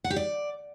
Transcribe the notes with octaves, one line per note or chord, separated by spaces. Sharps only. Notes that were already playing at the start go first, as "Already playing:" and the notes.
F#5
G4
D5